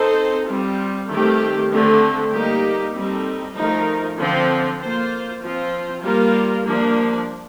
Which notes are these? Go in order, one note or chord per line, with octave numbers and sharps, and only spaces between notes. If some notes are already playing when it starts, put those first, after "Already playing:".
Already playing: C4 D#4 A4 C5
G3 C4 F4
D#3 A3 C4 G4
D3 A3 C4
G3 A#3 D#4 G4
G3 C4 D#4 A4
F3 A3 D#4 A#4
D3 F3 C4
A#3 F4 C5
F3 C4 F4 C5
G3 A#3 F4 A#4
F3 A#3 D4